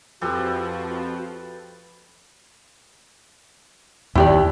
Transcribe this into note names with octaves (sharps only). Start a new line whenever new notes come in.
F2 F3 F#4 G4 A4 B4
D#2 E4 G4 D5